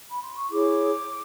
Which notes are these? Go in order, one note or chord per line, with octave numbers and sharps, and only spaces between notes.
B5
C6
C#6
E4 G#4 C#5 D6